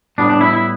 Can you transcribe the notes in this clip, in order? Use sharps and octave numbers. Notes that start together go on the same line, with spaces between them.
A2 G3 B3 D4
D4
E4
E4